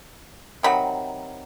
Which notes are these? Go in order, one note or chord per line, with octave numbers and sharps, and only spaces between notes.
C3 D#3 F#3 B5